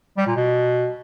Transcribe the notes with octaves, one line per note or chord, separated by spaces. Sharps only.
G3
A#2
B2